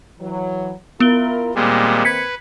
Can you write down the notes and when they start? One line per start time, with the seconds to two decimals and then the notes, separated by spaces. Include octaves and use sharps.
0.20 E3 F#3
1.00 B3 E4 F4 A#4 D7 G7
1.55 A#2 D#3 G3 G#3 A#3 C4
2.05 B4 G#6 B6 C#7